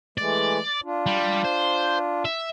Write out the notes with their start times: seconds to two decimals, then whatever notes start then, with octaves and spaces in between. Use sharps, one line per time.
0.18 E3 G#3 A3 D5
0.84 D4 F4
1.06 G3
1.45 C5
2.25 E5